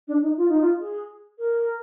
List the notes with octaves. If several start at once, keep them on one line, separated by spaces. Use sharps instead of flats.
D4
D#4
F4
D#4
F4
G#4
A#4